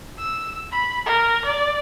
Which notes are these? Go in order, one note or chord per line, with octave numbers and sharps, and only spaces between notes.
E6
B5
A#4
D5